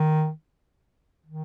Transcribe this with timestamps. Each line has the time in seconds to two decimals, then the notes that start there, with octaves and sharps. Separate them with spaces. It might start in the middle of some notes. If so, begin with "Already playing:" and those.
Already playing: D#3
1.26 D#3